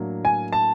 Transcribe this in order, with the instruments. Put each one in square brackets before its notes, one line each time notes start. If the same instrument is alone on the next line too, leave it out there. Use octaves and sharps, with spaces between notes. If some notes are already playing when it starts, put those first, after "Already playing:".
Already playing: [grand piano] A2 F#3 A#3 D4
[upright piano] G#5
A5